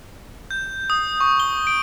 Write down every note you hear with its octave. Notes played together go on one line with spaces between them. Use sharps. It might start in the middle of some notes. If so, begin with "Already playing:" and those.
G6
D#6
C#6
G7
D7